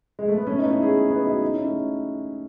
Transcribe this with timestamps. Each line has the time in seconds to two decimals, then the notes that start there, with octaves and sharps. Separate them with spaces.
0.19 G#3
0.28 A3
0.37 B3
0.47 A3 C#4
0.59 B3 D#4
0.70 C#4 E4
0.82 E4 G#4
1.10 B3 D#4
1.26 D#4 F#4
1.42 D#4
1.54 C#4 E4
1.65 A3 C#4